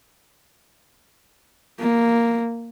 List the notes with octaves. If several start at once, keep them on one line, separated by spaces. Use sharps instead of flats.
A#3